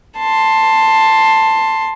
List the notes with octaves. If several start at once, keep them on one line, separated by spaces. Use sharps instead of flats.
A5 C6